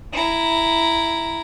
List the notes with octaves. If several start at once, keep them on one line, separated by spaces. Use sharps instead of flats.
E4 A#5